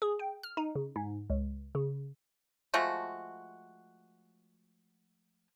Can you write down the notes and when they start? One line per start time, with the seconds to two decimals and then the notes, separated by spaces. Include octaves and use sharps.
0.02 G#4
0.19 G5
0.43 F6
0.57 D#4
0.75 C#3
0.96 G#2
1.30 C#2
1.75 C#3
2.74 F3 G#3 A3 F#4